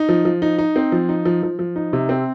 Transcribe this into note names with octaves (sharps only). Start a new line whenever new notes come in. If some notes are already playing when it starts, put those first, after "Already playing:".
Already playing: D#4
F3
F3
D#4
D#4
C4
F3
D#4
F3
F3
F3
D#4
C3
C4